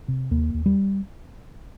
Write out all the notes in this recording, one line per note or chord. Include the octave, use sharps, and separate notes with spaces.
C3
D#2 A#3
D#2
G3